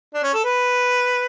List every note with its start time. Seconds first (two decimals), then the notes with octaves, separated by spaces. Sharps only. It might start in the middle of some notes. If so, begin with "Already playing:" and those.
0.14 D4
0.23 C#4
0.34 A4
0.44 B4